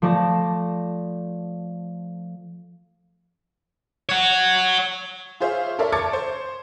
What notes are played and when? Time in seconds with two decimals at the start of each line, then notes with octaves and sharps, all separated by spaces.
0.02 F3 A3 D5 A5 A#6
4.09 C#5 F#5
5.40 F4 G#4 C5 C#5 E5 F5
5.79 A4 A#4 C#5 D5 E5
5.92 C#5 A5 D6 G#6 A6 C#7
6.13 C5